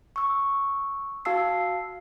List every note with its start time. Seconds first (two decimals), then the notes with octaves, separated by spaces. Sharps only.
0.16 C#6 E6
1.25 F#4 F5 A5 E6 C7